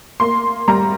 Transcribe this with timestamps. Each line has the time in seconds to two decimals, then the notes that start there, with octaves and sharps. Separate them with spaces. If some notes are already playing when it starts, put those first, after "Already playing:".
0.20 A#3 C6
0.68 G3 A#5